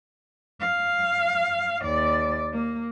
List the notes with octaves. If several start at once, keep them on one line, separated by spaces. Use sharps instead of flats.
F5
D#2 D5
A#3